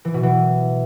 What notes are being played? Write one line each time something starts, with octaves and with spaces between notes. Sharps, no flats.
E3
B2
E3